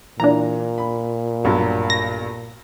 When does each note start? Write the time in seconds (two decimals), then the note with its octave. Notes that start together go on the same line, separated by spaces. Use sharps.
0.20 A#2 E3 D4 A#5
0.78 B5
1.44 B1 G2 F#3
1.90 A#6